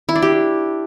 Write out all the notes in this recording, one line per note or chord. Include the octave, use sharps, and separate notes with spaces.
E4
D4
G4